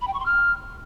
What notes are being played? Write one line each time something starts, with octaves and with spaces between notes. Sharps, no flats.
B5
G5
C#6
C6
F6